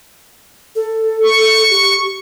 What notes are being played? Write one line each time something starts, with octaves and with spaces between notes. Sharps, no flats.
A4
C#6
G4